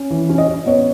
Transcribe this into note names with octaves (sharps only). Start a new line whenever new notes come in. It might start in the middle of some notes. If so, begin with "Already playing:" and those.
Already playing: C#4
E3
C#4
D#5
C#4
B3 C#5